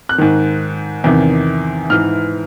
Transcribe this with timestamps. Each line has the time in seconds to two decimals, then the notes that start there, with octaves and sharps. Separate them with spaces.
0.09 F#6
0.18 G#2 D#3
1.04 E2 C3 D#3
1.90 G#2 E3 F6